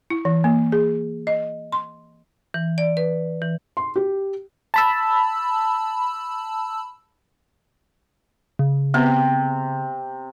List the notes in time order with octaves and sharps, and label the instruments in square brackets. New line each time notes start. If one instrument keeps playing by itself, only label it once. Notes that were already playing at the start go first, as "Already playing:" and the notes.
[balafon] E4
E3
A#3
G#4
D#5
C6
[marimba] E3
D5
B4
E3
[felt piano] C6
G4
[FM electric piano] A5 B5 E6
[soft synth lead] C#3
[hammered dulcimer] C3 [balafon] B3